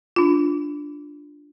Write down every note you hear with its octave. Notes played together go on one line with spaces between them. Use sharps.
D4 F4